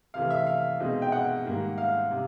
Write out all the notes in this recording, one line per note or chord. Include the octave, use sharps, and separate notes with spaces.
C3 E3 A3 F5
E5
F5
B2 G#3 C4 D#4
G5
F#5
G#2 D#3 G3 A#3
F5
C3